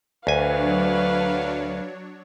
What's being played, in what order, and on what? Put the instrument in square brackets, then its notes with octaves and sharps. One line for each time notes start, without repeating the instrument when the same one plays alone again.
[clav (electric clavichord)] D2 G#5 [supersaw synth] F#3 D4 C#5 [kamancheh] B4 F5